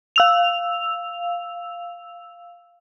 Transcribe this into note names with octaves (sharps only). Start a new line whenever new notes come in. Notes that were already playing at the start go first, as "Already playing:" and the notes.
F5 E6 F7